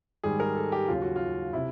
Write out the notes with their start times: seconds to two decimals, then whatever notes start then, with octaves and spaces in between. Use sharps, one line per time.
0.23 G#2 D#3 G3 G#4
0.40 A#4
0.56 A4
0.72 G4
0.88 D#2 C#3 F#3 F4
1.02 F#4
1.16 F4
1.53 C3 E4